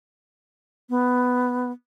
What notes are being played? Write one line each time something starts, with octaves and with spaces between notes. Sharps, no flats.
B3